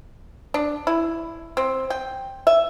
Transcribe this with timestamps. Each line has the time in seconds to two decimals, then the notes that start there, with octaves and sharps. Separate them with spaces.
0.54 D4
0.87 E4
1.57 C4
1.90 G5
2.47 E5